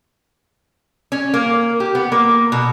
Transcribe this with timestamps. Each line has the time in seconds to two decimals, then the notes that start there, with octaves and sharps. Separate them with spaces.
1.12 C#4
1.34 A#3
1.80 G4
1.95 B3
2.12 A#3
2.52 B2